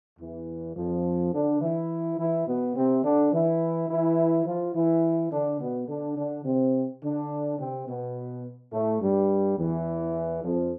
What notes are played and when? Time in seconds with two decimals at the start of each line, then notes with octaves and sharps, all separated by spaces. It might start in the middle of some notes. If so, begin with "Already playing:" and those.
0.19 E2 E3
0.76 F2 F3
1.33 D3 D4
1.61 E3 E4
2.18 E3 E4
2.47 B2 B3
2.75 C3 C4
3.03 D3 D4
3.33 E3 E4
3.89 E3 E4
4.46 F3 F4
4.74 E3 E4
5.31 D3 D4
5.60 B2 B3
5.88 D3 D4
6.16 D3 D4
6.45 C3 C4
7.02 D3 D4
7.59 C3 C4
7.87 B2 B3
8.72 A2 A3
9.01 G2 G3
9.58 E2 E3
10.43 F2 F3